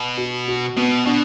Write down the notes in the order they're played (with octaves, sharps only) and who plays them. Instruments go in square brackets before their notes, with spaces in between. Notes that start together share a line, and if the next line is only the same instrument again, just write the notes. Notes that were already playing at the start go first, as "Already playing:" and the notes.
Already playing: [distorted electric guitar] B2
[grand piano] F#4
F#4
[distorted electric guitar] B2 [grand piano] B3
[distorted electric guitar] B2 [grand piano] D4